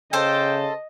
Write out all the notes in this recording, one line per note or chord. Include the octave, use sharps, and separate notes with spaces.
C#3 A4 C5 D#5 G5